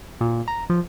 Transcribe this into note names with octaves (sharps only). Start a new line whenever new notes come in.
A#2
A#5
F3